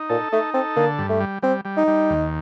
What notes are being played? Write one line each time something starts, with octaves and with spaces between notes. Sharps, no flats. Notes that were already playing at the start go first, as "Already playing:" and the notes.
Already playing: D#4
A#2 A4
A3 D#4
C4 A4
D3 A#3
G2
A3
G3
G3 C4
G3
D#4
G3
D#2